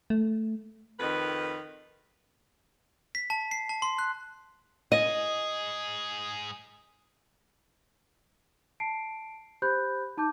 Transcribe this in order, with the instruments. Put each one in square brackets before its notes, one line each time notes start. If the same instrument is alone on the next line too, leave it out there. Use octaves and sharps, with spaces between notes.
[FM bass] A3
[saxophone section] F2 D#3 B4
[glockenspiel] B6
A5
C7
A5
C6
F#6
[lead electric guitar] G#2 G#4 [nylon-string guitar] D#5
[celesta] A5 C7 D7
G4 C5 B5 F#6 G6
D#4 A5 D6 G6